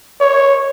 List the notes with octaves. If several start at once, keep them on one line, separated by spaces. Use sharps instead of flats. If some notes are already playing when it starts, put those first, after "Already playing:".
C#5